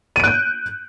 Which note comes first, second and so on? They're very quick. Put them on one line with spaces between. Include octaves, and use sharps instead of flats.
D#7 D7 F#6 G6